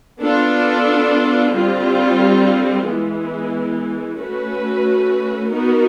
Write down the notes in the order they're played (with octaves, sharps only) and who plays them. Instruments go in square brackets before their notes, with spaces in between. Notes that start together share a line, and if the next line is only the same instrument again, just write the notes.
[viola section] B3 D4 F4 A4
D3 G3 C4 F4
E3 G#3 B3
A3 C#4 F#4 B4
B3 D#4 F#4 A#4